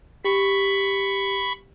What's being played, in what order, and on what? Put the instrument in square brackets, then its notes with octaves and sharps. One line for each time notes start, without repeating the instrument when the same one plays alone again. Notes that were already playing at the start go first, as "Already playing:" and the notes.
[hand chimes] G4 [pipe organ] B5 C#6